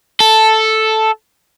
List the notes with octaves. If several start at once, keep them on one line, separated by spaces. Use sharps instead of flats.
A4